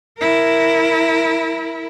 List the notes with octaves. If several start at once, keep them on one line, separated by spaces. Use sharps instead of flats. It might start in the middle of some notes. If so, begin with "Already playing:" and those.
E4 A#4